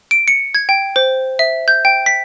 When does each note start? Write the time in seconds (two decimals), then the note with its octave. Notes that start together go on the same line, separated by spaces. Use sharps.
0.11 D7
0.28 C#7
0.55 G#6
0.69 G5
0.96 C5
1.39 E5
1.68 G6
1.85 G5
2.06 B6